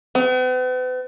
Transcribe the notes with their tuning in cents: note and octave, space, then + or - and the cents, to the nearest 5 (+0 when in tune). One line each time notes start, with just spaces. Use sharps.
B3 +45